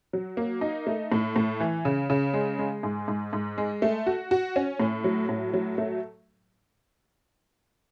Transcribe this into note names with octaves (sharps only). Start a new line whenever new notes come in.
F#3
A#3
D#4
A3
A2
A2
E3
C#3
C#3
G#3
G#3
G#2
G#2
G#2
G#3
A3
F#4
F#4
C#4
A2
F#3
A2
F#3
A3